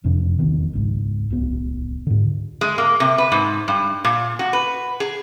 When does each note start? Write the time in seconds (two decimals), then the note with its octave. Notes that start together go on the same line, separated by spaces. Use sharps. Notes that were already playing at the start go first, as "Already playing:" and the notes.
0.04 F#1 F2 C3 D4
0.39 E1 B1 E2 D#3
0.73 G#1 C#2 G#2
1.30 D1 C2 B3
2.07 G#2 D3
2.61 G#3
2.78 A#3
3.00 C3
3.18 B4
3.32 G#2
3.68 G2
4.04 A#2
4.39 F#4
4.53 B4
5.00 G#4